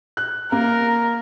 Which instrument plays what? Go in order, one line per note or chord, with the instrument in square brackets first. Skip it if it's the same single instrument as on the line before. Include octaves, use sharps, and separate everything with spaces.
[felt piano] F#6
[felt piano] A#3 [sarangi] A#4